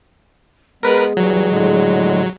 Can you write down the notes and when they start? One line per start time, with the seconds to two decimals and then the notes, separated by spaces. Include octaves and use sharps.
0.83 G#3 B3 G#4 A#4 B4
1.17 E3 F#3 G3
1.49 A2 D3 G#3